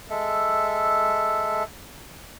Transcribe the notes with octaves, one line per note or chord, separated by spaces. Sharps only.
G#3 A4 E5